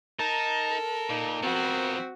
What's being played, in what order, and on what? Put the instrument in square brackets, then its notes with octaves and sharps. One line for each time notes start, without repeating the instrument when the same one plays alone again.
[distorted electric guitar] D#4 [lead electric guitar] A#4 [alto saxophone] A5
[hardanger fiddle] A4
[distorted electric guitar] A#2 [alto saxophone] D#4
[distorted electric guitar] F3 B3 [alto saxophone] C4 [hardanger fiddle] F#4